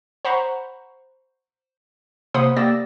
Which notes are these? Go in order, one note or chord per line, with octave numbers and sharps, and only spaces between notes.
C5 F#5 A#5 B5 C#6
C3 A#3 C5 F#5 B5 D#6
A#3 G4 D5 E6 A6 A#6